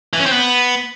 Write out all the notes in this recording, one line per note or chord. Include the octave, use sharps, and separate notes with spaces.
E3
C#4
C4
B3